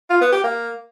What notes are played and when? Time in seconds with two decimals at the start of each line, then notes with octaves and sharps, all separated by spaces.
0.10 F4
0.21 B3
0.32 G4
0.43 A#3